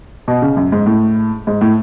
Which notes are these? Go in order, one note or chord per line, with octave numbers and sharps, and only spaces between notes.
B2
C#3
F#2
G#2
A2
G#2
A2